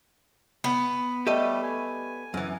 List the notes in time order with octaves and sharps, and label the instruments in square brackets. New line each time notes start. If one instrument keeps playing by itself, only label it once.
[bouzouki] B3
[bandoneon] G3 A3 [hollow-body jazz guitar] G4 A4 D#5
[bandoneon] G#5
[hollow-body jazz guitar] F#2 E3